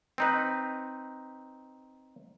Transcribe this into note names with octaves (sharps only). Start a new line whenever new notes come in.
C4 D#4 B4